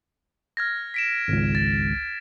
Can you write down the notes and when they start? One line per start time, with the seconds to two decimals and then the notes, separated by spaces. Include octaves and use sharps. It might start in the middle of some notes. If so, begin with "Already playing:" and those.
0.57 F6 G#6 A#6
0.94 B6 D7 E7
1.28 G#1 C#2
1.55 A6